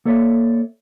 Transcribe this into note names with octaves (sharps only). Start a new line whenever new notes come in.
A#3 A4 C#5 D5 E5